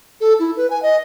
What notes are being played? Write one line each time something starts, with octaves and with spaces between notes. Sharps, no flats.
A4
E4
B4
G#5
D#5